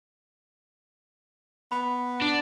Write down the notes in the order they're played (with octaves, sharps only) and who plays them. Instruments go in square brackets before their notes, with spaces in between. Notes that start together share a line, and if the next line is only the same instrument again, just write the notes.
[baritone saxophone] B3 [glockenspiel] B5
[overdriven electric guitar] D4